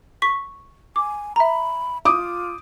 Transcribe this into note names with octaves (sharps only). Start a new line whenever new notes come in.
C#6 B6
G#5 D6
E5 A#5 B5
F4 D6 D#6